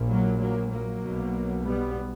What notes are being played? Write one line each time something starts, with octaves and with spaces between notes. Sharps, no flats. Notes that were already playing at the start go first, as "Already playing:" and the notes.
Already playing: A#1 A#2
F#3 A#3
F#3 A#3
F#3 A#3
B1 B2
G3 B3